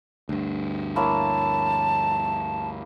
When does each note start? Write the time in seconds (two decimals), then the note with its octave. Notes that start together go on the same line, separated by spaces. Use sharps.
0.29 D2 G2
0.96 A#3 E4 C#5 A5